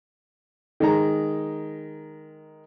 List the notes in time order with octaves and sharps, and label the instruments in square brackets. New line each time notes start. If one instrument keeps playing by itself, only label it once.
[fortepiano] D#3 G#3 A#5